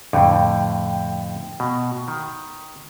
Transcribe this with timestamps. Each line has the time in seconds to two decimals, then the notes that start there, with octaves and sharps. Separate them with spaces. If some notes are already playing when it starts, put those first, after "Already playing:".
0.13 F2 A2 D3 G5
1.60 B2
2.08 D#3